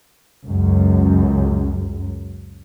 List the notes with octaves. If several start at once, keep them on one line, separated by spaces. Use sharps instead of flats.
C#2 F#2